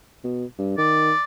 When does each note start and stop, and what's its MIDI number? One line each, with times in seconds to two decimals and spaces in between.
0.24 0.45 47
0.59 0.78 43
0.78 1.12 51
0.78 1.24 74